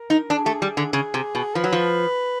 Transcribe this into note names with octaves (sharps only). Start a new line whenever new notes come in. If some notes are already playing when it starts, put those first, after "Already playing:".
Already playing: A#4
D#4
D4 A4
G#4
A3 G4
G#4
G3
D3
C#3 G#4
C3
B2
F3 B4
F#3
F3